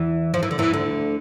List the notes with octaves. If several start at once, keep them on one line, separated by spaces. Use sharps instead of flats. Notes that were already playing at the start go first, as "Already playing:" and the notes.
Already playing: E2 E3
F3
E3
D3
E2 E3
D2 D3